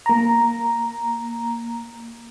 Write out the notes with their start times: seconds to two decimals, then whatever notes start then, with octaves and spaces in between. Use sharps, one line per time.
0.06 A#3 A#5